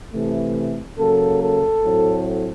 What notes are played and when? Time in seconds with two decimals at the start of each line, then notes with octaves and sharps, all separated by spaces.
0.12 C3 E3 A3
0.97 C#3 F#3 A#3 A4
1.40 A4
1.83 A2 F#3 A3 C4